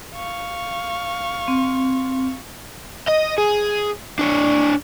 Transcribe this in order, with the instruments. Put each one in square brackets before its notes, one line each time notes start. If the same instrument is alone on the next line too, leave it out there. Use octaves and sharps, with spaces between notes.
[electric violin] F5 C#6
[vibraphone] C4
[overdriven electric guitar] D#5
G#4
D4 C#5